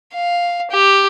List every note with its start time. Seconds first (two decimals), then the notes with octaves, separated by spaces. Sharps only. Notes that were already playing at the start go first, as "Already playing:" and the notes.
0.14 F5
0.71 G4